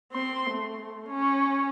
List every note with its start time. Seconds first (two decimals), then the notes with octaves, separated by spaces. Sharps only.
0.12 C4 C6
0.50 A3
1.09 C#4